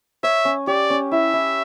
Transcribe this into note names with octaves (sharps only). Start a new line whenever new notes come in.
C#5 E5
C#4
G4 D5
C#4
E4 E5
E4